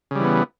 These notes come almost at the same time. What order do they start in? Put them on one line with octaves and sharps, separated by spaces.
C#3 G3 E3 B3